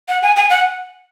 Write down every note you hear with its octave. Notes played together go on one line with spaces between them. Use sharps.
F#5
G#5
G#5
F#5